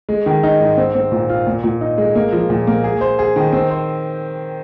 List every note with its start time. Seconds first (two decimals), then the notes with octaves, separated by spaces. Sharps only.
0.09 G#3
0.26 D#3
0.43 D#4
0.60 G#2
0.77 C4
0.95 C4
1.12 A#2
1.29 F4
1.47 A#2
1.64 A#2
1.81 D#4
1.98 G#3
2.15 A#3
2.33 F3
2.50 A#2
2.67 A#3
2.84 G#4
3.01 C5
3.19 G#4
3.36 D#3
3.53 C4
3.71 C5